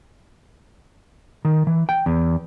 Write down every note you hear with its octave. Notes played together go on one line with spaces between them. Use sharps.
D#3
E3
G5
E2